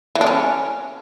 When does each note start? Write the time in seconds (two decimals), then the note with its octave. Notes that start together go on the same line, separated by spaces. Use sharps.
0.15 E3
0.21 D4
0.26 C#4